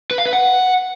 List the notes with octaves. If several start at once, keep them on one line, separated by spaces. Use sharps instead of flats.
B4
F5
B4
F#5